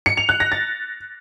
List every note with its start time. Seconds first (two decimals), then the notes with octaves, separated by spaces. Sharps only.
0.06 C#7
0.17 F7
0.29 F#6
0.40 A#6
0.52 A6